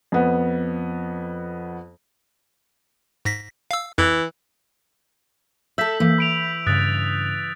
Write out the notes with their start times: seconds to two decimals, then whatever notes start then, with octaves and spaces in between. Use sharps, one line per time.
0.12 F2 B3
3.25 G#2 A#6 B6
3.71 F5 E6
3.98 F2 E3
5.78 A4 E5 E6 G6 B6
6.00 E3 A#3
6.18 B5 E6 D7 F7
6.67 G2 C#3 D#6 F#6 A6